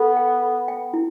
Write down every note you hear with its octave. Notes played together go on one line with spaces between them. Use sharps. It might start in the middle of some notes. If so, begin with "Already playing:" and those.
Already playing: B3 A4
G5
A4
G5
E4